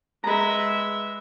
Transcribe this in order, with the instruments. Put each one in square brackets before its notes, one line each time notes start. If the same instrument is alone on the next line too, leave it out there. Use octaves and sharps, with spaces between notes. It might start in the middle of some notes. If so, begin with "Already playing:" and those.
[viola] G#3 E5 [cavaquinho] B4 A#5